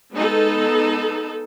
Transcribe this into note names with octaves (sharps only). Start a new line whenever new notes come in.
G#3 B3 D#4 A4